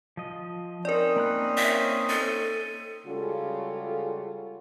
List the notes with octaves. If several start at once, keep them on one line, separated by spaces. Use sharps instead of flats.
F3 D#5
C4 C#4 D#4 A#4 C5 D5
A#3 B5 F#6
E5
A4 A6 D#7
C#3 G3 G#3 F4 F#4 A4